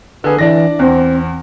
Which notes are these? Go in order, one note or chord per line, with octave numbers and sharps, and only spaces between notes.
D3 G#4 B4
E3 D4 D5 A#6
E2 C4